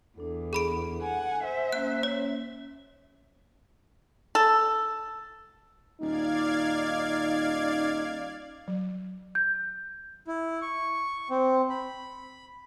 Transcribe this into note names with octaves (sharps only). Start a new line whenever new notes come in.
E2 D4 A4
G#4 B5 D7
F#5 G#5
C5 E5 G#5
A#3 C#4 F#6
C#5
A4
D#1 D#4 D5 F5 G#6
F#3
G6
E4
C#6
C4
B5